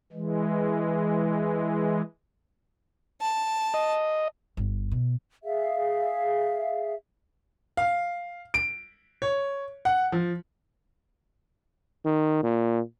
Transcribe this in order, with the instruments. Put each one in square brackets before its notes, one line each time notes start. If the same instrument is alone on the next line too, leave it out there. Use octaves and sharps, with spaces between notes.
[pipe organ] E3 G#3
[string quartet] A5
[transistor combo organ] D#5
[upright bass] G1
B2
[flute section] G#4 E5 F5
[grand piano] F5
D7
C#5
F#5
F3
[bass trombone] D#3
A#2